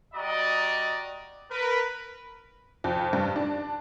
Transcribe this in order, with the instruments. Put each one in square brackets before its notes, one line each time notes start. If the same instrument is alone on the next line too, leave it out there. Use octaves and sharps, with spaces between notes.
[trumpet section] G3 F#4 D5 D#5 A#5
A#4 B4
[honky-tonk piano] F2
G2
D4